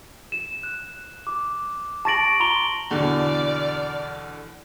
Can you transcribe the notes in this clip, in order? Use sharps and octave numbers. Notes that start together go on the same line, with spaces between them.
E7
F#6
D6
A5 C#6 A6 A#6 D7 F#7
A#5 C6 F7 G7
E2 B2 D3 D5 F6